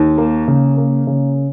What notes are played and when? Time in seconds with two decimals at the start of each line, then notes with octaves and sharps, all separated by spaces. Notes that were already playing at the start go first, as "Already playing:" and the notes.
Already playing: D#2
0.18 A#3
0.48 C#3
0.77 A#3
1.07 C#3